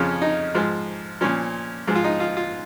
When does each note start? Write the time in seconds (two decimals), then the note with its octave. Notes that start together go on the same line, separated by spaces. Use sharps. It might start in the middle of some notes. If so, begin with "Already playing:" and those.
Already playing: F2 C#3 F3 C#4
0.22 D#4
0.55 G#2 F3
1.21 A#2 F3 C#4
1.88 G#2 F3
1.95 F4
2.04 D#4
2.20 F4
2.37 F4